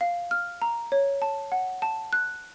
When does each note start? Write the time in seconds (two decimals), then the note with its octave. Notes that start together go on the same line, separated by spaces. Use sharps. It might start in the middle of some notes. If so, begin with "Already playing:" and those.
0.01 F5
0.31 F6
0.62 A#5
0.92 C#5
1.22 A5
1.52 F#5
1.82 A5
2.13 F#6